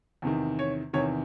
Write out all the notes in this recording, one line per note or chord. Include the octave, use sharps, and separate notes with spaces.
E2 C3 D#3
C#5
E2 C3 D#3 C#5